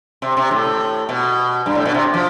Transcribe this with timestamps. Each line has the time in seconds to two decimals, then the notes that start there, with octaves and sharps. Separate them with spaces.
0.22 C3
0.37 C3
0.51 A2
1.09 B2
1.66 G2
1.75 A2
1.85 B2
1.94 C3
2.14 F3